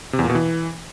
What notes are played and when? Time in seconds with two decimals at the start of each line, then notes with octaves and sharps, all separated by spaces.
0.13 C3
0.19 E2
0.24 A#2
0.30 B2
0.35 E3